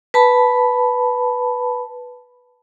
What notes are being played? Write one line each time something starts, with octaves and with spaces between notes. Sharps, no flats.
B4 A5 B5